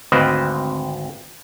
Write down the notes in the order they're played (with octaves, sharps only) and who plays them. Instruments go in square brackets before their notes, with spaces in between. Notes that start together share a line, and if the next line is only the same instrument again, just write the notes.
[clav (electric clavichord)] G#1 D2 C4 B4 D#5 F5